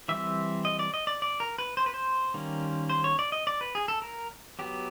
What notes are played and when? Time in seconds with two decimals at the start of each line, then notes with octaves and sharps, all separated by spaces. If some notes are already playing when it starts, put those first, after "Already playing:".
0.08 E3 G3 C4 E5
0.65 D#5
0.79 D5
0.94 D#5
1.07 D5
1.22 D5
1.40 A#4
1.59 B4
1.77 C5
1.86 B4
1.94 C5
2.34 D#3 G3 A#3 C#4
2.89 C5
3.04 C#5
3.19 D5
3.32 D#5
3.47 D5
3.61 B4
3.75 G#4
3.88 A4
4.02 A#4
4.59 F#3 B3 G4